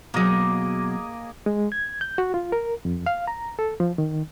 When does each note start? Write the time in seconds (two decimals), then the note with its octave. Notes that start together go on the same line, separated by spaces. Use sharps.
0.14 B2 F#3 A#3 G#4 D#5
1.46 G#3
1.72 G#6
2.01 G6
2.18 F#4
2.34 F4
2.52 A#4
2.85 F2
3.06 F5
3.27 A#5
3.59 A4
3.80 F3
3.98 D#3